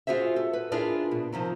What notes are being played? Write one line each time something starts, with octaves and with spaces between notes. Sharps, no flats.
F4 F#4 G#4 C5 E5
A4
B4
D4 E4 F4 G#4 A#4 D5
B2
C3 D#3 F3